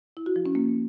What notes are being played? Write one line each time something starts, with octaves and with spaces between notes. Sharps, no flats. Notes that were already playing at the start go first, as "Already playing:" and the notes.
E4
F#4
F3
C#4
A#3